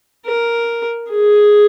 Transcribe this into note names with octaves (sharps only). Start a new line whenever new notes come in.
A#4
G#4